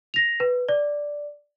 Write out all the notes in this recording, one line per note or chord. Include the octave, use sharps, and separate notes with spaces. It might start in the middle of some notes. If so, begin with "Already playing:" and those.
A#6 F7
B4
D5